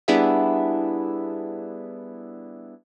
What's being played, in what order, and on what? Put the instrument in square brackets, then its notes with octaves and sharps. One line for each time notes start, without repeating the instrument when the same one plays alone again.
[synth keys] G3 B3 D4 E4 G#4 E5